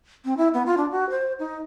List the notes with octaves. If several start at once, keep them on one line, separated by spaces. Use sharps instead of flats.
C4
E4
B3
F4
D4
F#4
C5
D#4